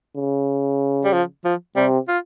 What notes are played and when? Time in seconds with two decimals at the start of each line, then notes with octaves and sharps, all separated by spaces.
0.17 C#3
1.04 G3
1.13 F3
1.45 F3
1.76 C3 G3
2.08 F4